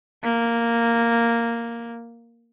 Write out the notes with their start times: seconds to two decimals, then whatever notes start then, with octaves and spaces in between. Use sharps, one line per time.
0.24 A#3